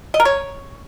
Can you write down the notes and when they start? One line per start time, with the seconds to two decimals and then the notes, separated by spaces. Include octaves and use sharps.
0.14 D#5
0.20 A#4
0.25 C#5